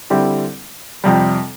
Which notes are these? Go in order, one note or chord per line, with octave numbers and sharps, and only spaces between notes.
D3 G3 C4 E4 G4
F2 C3 G3